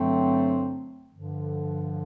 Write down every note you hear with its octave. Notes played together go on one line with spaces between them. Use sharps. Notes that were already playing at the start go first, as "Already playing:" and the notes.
Already playing: G2 D3 F#3 A3 C4
G2 D3 F3